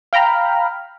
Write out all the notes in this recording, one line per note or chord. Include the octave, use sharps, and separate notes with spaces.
F5 G5 A#5 B5 F6